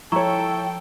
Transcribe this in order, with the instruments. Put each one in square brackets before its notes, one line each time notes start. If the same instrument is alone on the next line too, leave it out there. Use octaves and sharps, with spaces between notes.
[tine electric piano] F3 [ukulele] E4 C#5 [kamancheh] A4 G5 [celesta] A#5 C#6